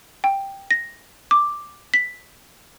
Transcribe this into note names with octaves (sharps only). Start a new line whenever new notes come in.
G5
A#6
D6
B6